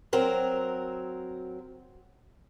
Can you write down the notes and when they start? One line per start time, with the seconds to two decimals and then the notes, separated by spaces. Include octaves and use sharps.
0.13 F#3 C4 A#4